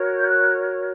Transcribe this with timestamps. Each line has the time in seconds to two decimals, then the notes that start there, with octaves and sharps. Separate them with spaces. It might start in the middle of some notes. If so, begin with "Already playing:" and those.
Already playing: F#4 A#4 C#5
0.17 G6
0.28 F#6